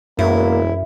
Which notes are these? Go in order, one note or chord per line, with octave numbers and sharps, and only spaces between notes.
E1 F#2 A#3 E4